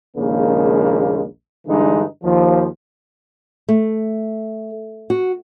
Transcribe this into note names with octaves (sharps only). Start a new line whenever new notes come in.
A#1 D#2 C#3 G#3 A#3
G2 D3 E3 G#3 D#4
D#2 F3
A3
F#4